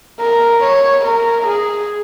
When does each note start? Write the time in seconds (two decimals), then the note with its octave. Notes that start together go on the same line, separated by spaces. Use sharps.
0.20 A#4
0.63 C#5
1.05 A#4
1.46 G#4